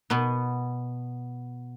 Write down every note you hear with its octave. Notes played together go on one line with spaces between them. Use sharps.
B2 B3